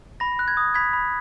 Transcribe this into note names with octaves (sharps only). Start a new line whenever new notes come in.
B5 A#6
F#6
G#6
D#6
B5 G#6 B6
B5